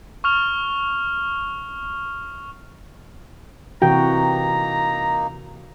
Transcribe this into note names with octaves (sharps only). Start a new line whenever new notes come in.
C#6 F6 F7
C3 E3 A#3 D#4 F#4 G5 A#5